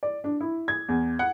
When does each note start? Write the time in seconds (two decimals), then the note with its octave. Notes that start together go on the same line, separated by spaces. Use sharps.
0.03 D5
0.24 D4
0.41 E4
0.68 G#6
0.89 E2
1.19 F#5